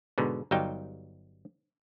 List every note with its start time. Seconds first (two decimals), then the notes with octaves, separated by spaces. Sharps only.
0.18 G#2 B2 D3
0.51 G1 F#3 G3 D#4 G5